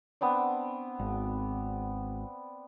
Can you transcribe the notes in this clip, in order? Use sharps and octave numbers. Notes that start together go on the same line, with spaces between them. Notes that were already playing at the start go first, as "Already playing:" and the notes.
B3 C4 D4
G#1